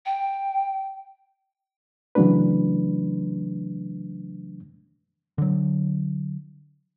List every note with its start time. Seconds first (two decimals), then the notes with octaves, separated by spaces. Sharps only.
0.06 G5
2.15 C#3 E3 F#3 A3 D4 B4
5.38 D3 F#3